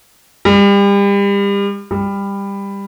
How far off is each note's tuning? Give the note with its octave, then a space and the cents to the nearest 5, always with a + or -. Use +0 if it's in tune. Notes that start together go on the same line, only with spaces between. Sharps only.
G3 +35
G3 +20